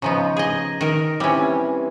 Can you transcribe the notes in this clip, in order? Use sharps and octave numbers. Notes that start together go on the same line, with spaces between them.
C#3 F3 B3 D#4 A#5 C#6
G#4 D#5
D#3 A#4
C3 E3 G3 C#4